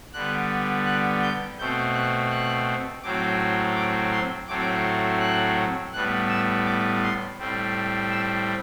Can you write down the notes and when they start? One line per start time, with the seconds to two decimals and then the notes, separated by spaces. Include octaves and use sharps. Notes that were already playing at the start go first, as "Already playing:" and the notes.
0.13 D3 G3 B3 F#6
0.86 F#6
1.23 G6
1.58 B2 A3 C4 G6
1.94 F#6
2.31 F#6
3.03 A2 F#3 C4 D6
3.75 D6
4.12 C6
4.48 A2 F#3 A3 C4 D6
5.20 F#6
5.93 A2 G3 B3 F#6
6.29 E6
6.66 D6
7.03 C6
7.38 A2 G3 C4
8.11 E6